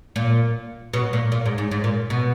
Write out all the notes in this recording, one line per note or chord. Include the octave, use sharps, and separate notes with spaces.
A#2
B2
A#2
A#2
G#2
G#2
G#2
A#2
B2